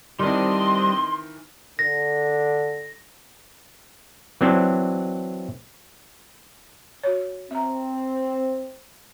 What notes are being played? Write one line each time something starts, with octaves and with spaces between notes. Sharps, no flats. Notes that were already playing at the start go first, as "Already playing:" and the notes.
D#3 E3 G3 C4 D4 D#5 C6
D3 A#6
E3 F#3 C4 D4
F#4 C#5
C4 E5 A#5